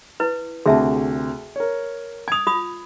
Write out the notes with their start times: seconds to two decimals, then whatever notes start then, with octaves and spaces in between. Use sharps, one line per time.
0.20 E4 B4
0.66 D2 C3 G#4 E5 A5
1.56 A#4 C#5
2.28 G#5 D#6 G#6 F7
2.47 F4 B5 D#6